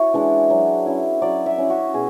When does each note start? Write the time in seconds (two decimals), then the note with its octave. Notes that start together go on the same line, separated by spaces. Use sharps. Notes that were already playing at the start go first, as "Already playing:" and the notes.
Already playing: E4 F#4 C#5
0.14 E3 G#3 D4
0.50 F#3
0.86 C#4 E4
1.22 F#3 D5
1.46 E5
1.58 C#4 E4
1.70 F#4
1.94 B2 G#4